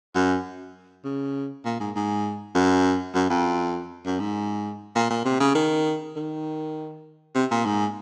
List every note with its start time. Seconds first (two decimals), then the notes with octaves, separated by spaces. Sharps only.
0.15 F#2
1.04 C#3
1.65 A#2
1.80 G#2
1.96 G#2
2.55 F#2
3.15 F#2
3.30 F2
4.06 F#2
4.20 G#2
4.96 A#2
5.10 A#2
5.25 C3
5.40 C#3
5.55 D#3
6.16 D#3
7.35 C3
7.51 A#2
7.65 G#2